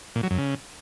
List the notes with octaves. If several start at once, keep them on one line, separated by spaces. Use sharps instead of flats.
A#2
F#3
F#2
C#3